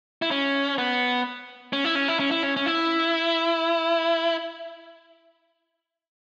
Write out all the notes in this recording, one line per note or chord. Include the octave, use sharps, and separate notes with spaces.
E4
C#4
B3
C#4
E4
C#4
E4
C#4
E4
C#4
C#4
E4